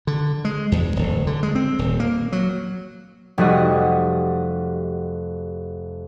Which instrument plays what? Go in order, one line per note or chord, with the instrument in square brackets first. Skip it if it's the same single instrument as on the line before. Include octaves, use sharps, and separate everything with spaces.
[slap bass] D3
G#3
E2
D1
D3
G#3
C4
D#1
A#3
F#3
[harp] F1 G3 F#4 D#5